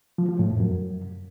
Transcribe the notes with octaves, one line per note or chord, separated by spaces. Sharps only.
F3
F3
A2
F2
F#2